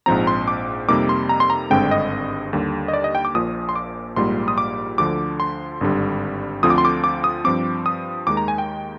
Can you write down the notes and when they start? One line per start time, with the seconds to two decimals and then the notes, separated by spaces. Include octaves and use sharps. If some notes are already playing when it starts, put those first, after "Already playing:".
0.06 A#1 G#2 F3 C4 A#5
0.27 C6
0.48 D6
0.88 F2 C3 G3 A#3 D#4 D6
1.09 C6
1.29 A#5
1.40 C6
1.50 A#5
1.70 G#1 G2 D3 G#3 C4 G5
1.91 D#5
2.53 D#2 D3 G3
2.88 D#5
2.93 D5
3.04 D#5
3.15 G5
3.25 D6
3.34 A#1 A#2 F3 D#6
3.69 C6
3.76 D6
4.16 A#1 G#2 G3 A#3 F4 C6
4.48 D#6
4.58 D6
4.98 D2 D3 F3 D6
5.40 C6
5.81 G#1 G2 D3 G3
6.63 D2 D3 F3 C4 F4 D#6
6.70 D6
6.78 C6
6.85 D6
7.04 D6
7.24 D#6
7.44 G2 F3 C4 D6
7.86 D#6
8.27 D#2 D#3 G#3 D#4 D6
8.37 A#5
8.48 G#5
8.58 G5